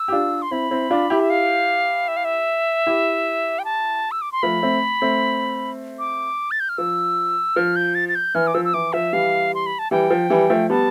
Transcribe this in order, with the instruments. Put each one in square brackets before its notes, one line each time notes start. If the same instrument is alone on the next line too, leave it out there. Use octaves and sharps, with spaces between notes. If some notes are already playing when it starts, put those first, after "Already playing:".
Already playing: [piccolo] E6
[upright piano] G4
D4 F4
[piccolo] C6
[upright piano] C4 E4 [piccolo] B5
[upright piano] C4 E4
D4 F4
E4 G4
[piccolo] E5
F5
E5
F5
E5
[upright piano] E4 G4
[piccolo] G5
A5
E6
D6
C6
[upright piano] F3 A3 [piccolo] B5
[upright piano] A3 C4
A3 C4
[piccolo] D6
A6
G6
F6
[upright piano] F3 [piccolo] E6
[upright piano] F3 [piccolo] F6
[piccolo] G6
A6
A6
G6
[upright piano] E3 [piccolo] F6
[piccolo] D6
[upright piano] F3 [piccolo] E6
[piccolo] E6
[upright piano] E3 [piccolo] D6
[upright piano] F3 [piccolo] E5
[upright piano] E3 G3 [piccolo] F5
[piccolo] C6
B5
A5
[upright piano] E3 G3 [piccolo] G5
[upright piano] F3
E3 G3
F3 A3
[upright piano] G3 B3 [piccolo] A5